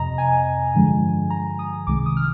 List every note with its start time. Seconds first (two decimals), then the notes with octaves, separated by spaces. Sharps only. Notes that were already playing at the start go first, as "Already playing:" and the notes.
Already playing: F2 C3 D#5 A#5
0.18 G#5
0.75 G2 D3 F3 G#3
1.30 A#5
1.59 D#6
1.87 C2 C3 D#3 G#3 D6
2.06 D#6
2.17 F6